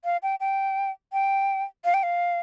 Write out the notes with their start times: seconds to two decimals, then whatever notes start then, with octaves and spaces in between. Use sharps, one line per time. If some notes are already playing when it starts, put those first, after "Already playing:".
0.05 F5
0.23 G5
0.40 G5
1.13 G5
1.85 F5
1.94 G5
2.03 F5